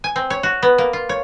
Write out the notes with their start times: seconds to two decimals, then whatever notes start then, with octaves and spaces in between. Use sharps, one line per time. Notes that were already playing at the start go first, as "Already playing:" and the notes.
0.04 G#5
0.16 C4
0.30 C#5
0.43 F#4
0.63 B3
0.78 A#3
0.93 F4
1.09 C#5